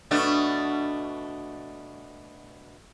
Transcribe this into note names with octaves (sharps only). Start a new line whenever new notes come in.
B2 A3 D4